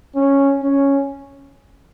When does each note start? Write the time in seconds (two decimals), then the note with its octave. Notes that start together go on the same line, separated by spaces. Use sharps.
0.15 C#4
0.62 C#4